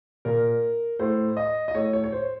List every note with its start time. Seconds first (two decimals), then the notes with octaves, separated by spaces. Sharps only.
0.25 A#2 A#4
0.99 A2 C5
1.37 D#5
1.68 D#5
1.75 A2 C#5
1.93 C#5
2.04 C#5
2.12 C5